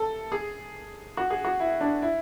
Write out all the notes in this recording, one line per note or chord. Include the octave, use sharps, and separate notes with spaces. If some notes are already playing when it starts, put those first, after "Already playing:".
Already playing: A4
G#4
F#4
G#4
F#4
E4
D4
E4